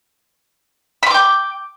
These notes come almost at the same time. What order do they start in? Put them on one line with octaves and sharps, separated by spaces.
B5 C6 D6 G5